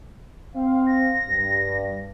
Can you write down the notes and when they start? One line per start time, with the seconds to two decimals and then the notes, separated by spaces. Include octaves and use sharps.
0.56 C4 C5 F5
0.87 A#6
1.28 G2